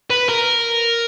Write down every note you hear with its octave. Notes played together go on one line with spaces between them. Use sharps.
B4
A#4